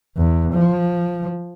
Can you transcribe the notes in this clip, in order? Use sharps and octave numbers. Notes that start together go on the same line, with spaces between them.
E2
F3